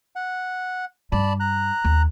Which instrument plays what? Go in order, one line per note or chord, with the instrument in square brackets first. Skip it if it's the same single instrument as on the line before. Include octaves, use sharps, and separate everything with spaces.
[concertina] F#5
[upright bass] G2 G3 [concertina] D5 A5 B5
[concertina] A#5 F#6
[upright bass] D#2